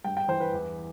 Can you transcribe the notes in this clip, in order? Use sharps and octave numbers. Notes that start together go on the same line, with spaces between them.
G2 G5
G5
E3 C5
B4
E2